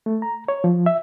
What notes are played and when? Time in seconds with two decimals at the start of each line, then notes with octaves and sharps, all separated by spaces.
0.06 A3
0.22 A#5
0.48 C#5
0.64 F3
0.86 E5